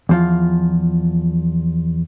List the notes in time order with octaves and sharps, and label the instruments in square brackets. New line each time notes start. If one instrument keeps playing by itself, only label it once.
[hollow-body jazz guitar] E2 F3 F4